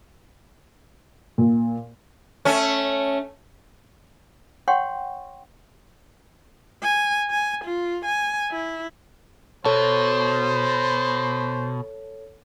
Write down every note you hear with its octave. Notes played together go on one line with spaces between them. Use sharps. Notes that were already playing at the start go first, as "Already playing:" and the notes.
A#2
A3 C#4
C#5 F#5 G5 C6 C#6
G#5
G#5
F4
G#5
E4
B2 A4 C5 C#5 A5